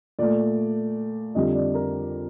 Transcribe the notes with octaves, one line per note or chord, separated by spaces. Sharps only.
A#2 A3 D5
F2 D3 G3 D#5
D5
A#4